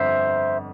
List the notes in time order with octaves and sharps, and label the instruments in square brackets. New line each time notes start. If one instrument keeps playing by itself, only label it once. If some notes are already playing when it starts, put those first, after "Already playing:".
Already playing: [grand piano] G1 F2 [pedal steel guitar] C5 E5